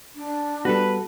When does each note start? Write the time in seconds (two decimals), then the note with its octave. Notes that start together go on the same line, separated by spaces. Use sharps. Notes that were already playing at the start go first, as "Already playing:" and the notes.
0.15 D4
0.65 G3 B3 F#4 A4 B4